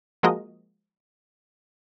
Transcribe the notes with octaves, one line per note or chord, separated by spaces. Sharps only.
F3 G#3 A#3 F#4 A#4 D#5